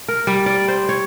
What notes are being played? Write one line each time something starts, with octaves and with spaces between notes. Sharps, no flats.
A#4
G3
D5
C5
C#5